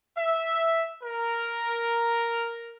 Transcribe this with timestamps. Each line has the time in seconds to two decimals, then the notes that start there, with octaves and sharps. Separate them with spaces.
0.17 E5
1.03 A#4